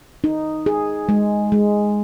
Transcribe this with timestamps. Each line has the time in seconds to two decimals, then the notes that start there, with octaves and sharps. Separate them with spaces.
0.24 D#4
0.66 G#4
1.09 G#3
1.52 G#3